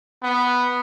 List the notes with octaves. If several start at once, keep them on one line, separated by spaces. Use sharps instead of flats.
B3